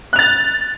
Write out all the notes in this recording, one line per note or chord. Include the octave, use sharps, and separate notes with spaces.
F#6 A6 F7